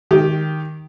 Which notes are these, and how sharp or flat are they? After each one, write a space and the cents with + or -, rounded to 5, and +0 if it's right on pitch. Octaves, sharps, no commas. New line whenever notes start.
D#3 +0 G4 +0